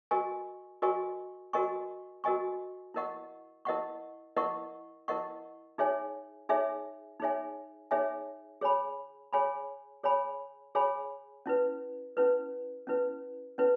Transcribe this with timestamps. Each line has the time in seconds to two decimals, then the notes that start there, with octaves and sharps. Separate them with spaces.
0.11 F#4 A#4 D#5 G#5 C#6
0.82 F#4 A#4 D#5 G#5 C#6
1.53 F#4 A#4 D#5 G#5 C#6
2.24 F#4 A#4 D#5 G#5 C#6
2.94 E4 A#4 D#5 F#5 C#6
3.65 E4 A#4 D#5 F#5 C#6
4.36 E4 A#4 D#5 F#5 C#6
5.08 E4 A#4 D#5 F#5 C#6
5.78 D#4 G#4 C#5 E5 G#5
6.49 D#4 G#4 C#5 E5 G#5
7.20 D#4 G#4 C#5 E5 G#5
7.91 D#4 G#4 C#5 E5 G#5
8.61 G#4 C#5 G#5 B5
9.33 G#4 C#5 G#5 B5
10.03 G#4 C#5 G#5 B5
10.75 G#4 C#5 G#5 B5
11.46 C#4 E4 B4
12.17 C#4 E4 B4
12.87 C#4 E4 B4
13.58 C#4 E4 B4